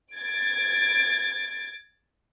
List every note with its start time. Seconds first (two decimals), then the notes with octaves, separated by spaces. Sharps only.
0.16 G#6 A6 D7